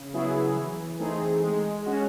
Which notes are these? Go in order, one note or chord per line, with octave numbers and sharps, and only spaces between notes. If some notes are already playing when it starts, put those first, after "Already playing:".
Already playing: C#3
F#3 B3 E4 G#4
E3
A3 C4 D#4 G#4
G#3
C#4 F#4